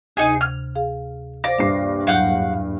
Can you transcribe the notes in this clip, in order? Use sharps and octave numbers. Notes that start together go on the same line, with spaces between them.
D2 C3 D#4 G#4
F6 G#6
G#4 F5
C5 D5 F5 A#6
A#1 G2 D4 C7
E2 G#2 F#3 F5 F#5 G6